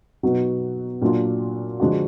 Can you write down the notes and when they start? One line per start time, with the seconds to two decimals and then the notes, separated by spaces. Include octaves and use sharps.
0.23 B2 F#3 B3 D#4 F#4
1.01 A#2 F#3 D4 F4
1.80 D3 F3 G#3 D4 F#4